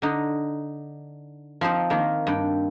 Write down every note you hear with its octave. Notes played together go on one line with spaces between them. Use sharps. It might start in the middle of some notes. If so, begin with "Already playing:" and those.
D3 D#4
F3 C4 D#4 C5
D#3 A#3
G2 G5